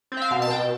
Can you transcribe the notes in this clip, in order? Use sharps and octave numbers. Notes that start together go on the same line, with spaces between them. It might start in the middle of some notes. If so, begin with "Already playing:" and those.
C4
E5
F5
B2
A5
B2 G5